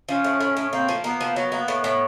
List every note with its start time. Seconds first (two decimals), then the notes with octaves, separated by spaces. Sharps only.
0.09 F3 C#4
0.24 A2
0.41 A2
0.57 A2
0.73 A#3 C4
0.89 F3
1.04 A#3 B3
1.21 F3
1.36 F#3
1.52 A#3
1.68 A2
1.84 A2